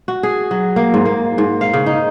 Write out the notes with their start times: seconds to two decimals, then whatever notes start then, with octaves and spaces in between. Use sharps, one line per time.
0.08 F#4
0.23 G#4
0.51 F#3
0.76 A#3
0.94 G#2
1.06 A#3
1.38 G#2
1.61 F5
1.73 C#3
1.86 D#4